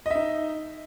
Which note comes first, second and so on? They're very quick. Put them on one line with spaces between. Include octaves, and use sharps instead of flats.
D#5 E5 D#4